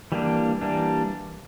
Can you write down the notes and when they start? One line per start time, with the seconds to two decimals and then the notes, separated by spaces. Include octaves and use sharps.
0.12 E3 G3 A#3 D4
0.61 E3 G3 A#3 D4